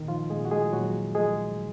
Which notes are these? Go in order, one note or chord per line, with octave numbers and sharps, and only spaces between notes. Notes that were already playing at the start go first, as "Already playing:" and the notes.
Already playing: A#2 D#3 D#4
F3 F4
A#2 G#3 G#4
F#4
G#3 G#4
A#2 F#3 F#4
F3 G#3 G#4